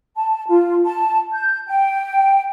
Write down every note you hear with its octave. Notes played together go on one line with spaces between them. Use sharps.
A5
F4
A5
G6
G5